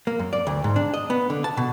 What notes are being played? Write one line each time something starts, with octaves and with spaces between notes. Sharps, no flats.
A#3
F#2
D5
D2
G#2
D4
D#5
B3
D3
A5
B2